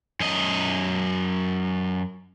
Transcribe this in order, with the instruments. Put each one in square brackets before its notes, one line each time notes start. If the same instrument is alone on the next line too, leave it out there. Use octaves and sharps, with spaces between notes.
[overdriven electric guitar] F#2 D#5